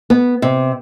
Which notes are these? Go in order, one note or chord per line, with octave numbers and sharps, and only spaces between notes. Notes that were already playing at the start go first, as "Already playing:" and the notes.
B3
C3